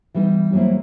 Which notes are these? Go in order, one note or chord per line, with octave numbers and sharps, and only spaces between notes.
E3 G3 B3 D#4
F#3 G3 A#3 C4 E4